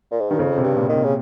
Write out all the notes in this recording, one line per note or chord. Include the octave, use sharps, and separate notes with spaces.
A#2
G#2
G2 D#3
F2 C#3
C3
G2
A#2
D#3
C3
C#3